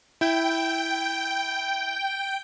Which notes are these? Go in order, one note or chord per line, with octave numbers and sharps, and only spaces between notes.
E4 G5